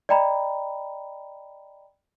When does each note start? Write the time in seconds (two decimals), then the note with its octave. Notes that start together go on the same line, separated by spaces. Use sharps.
0.09 D5 D#5 G5 A#5 B5